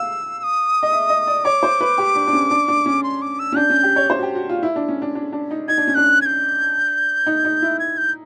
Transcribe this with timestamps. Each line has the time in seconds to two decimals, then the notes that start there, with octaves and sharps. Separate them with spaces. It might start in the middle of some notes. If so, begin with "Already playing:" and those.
Already playing: F5 E6
0.40 E6
0.44 D#6
0.83 D#5
0.93 E5
1.10 D#5
1.27 D5
1.44 C#5 D6
1.63 C5
1.81 B4
1.98 G4
2.15 D4
2.27 D4
2.33 C#4
2.51 D4
2.68 D4
2.86 C#4
3.03 C6
3.22 D6
3.39 E6
3.52 C#4
3.56 D4 G6
3.70 C#4
3.83 G4
3.96 C#5
4.10 C5
4.18 F#4
4.23 G4
4.35 F#4
4.49 F4
4.63 E4
4.76 D4
4.89 C#4
5.02 D4
5.15 D4
5.33 D4
5.51 D#4
5.68 D#4 G#6
5.77 D4
5.87 C#4
5.95 D4 F#6
6.22 G#6
6.26 G6
7.27 D#4
7.45 D#4
7.62 E4
7.80 G#6
7.98 G6